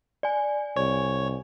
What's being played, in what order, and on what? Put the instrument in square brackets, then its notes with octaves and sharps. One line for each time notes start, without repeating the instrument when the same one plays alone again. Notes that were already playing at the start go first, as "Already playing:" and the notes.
[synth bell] D5 G#5
[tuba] C2 [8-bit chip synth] C#5